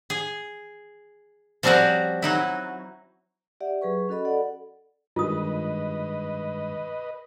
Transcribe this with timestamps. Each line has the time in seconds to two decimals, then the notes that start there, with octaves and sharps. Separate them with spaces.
0.10 G#4
1.63 F3 G3 C4 C#4 F#4 A#4
2.22 F#3 D#4 E4
3.61 G4 D5 E5 F#5
3.82 F#3 G#4 B4 C#6
4.09 C#4 F#4 A4 D#5 B5
4.25 A4 D5 F#5
5.16 G2 D#3 G#3 F4 B4 D#5 D#6